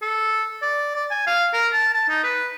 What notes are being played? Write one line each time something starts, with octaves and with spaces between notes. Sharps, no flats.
A4
D5
D5
G#5
F5
A#4
A5
A5
D#4
B4